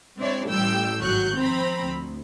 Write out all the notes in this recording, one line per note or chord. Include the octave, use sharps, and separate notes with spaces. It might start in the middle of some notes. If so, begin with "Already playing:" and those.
G#3 C4 D4 E4 C#5 D5
A1 A2 G3 G5 E6 G6
G#1 F#3 C#6 F#6 G6
F3 C4 A#5 B5
D2